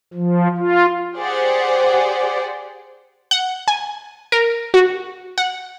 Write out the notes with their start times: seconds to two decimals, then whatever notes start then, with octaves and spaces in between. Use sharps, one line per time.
0.14 F3
0.57 F4
1.18 G4 G#4 C5 D5 F#5
3.31 F#5
3.68 G#5
4.32 A#4
4.74 F#4
5.38 F#5